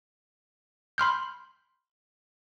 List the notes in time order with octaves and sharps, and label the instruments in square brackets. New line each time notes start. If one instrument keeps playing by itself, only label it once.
[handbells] B5 C6 F6 G6